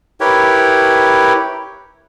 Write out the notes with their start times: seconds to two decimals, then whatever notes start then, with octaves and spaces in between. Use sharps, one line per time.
0.21 E4 G4 A#4 B4 C#5 G5